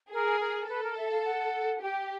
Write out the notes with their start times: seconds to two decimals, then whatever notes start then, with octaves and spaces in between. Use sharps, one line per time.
0.12 G#4 A#4
0.40 A#4
0.69 A4 B4
0.83 A#4
0.97 E5
1.11 F5
1.25 F#5
1.82 G4 G5